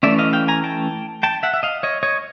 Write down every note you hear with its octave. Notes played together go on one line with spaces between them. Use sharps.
E3 A3 C#4 D5 E5
D#5 F5
F5 G5
G#5 A#5
G5 A5
G5 A5
E5 F#5
E5
D#5 F5
C#5 D#5
C#5 D#5